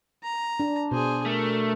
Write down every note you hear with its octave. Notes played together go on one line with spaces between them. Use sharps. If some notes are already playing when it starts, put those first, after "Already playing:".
A#5
D4
B2 G#4 C5
A3 A#4